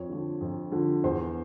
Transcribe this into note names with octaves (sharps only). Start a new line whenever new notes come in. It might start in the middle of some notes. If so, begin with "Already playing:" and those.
Already playing: F2 C#5
D3 F3
F2
D3 F3
E2 C5